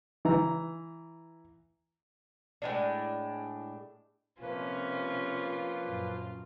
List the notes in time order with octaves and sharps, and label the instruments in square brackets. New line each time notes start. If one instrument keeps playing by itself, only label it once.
[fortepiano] E3 A#5
[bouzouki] A2 G#3 D4
[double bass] C3 [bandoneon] F3 A#3 B4 [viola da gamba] C#4 [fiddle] F4
[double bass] F#2 A#2